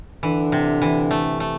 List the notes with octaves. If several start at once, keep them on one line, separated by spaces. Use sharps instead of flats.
D3 E3
C3
E3
A3
A3